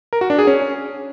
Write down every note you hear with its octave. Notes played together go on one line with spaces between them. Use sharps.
A#4
F#4
D4
G#4
C#4